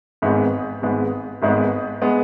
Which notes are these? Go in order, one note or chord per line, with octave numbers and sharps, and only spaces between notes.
G#1 G#2 G#3 B3
G#1 G#2 G#3 B3
G#1 G#2 G#3 B3
G#3 B3